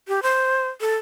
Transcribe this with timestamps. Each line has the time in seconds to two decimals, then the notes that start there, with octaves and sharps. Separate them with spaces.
0.08 G4
0.23 C5
0.81 A4